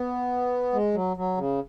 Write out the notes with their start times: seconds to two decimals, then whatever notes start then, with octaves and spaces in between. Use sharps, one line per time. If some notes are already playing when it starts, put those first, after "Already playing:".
Already playing: B3
0.73 G#3
0.94 F#3
1.17 F#3
1.37 C#3